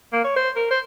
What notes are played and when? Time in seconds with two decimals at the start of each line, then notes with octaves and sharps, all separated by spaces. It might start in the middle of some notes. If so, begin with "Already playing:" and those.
0.13 A#3
0.24 C#5
0.36 C5
0.56 A#4
0.71 C5